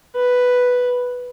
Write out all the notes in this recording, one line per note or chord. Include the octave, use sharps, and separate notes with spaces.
B4